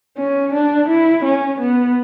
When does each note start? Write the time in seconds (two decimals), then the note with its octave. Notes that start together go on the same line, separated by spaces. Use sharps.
0.17 C#4
0.53 D4
0.89 E4
1.25 C#4
1.60 B3